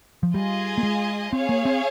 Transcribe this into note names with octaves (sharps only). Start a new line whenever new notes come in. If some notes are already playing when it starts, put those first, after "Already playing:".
F3
G3 F4 G#4 D#5 G#5
A#3
G#3
C4 G#4 C#5 F5
A#3
C4